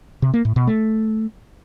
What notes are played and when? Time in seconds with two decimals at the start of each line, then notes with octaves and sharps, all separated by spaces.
0.22 C3
0.34 A#3
0.45 A2
0.56 B2
0.67 A3